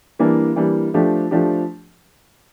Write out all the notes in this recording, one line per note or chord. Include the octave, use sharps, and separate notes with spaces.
E3 G3 A#3 D4
E3 G3 A#3 D4
F3 A3 D4 G4
F3 A3 D4 G4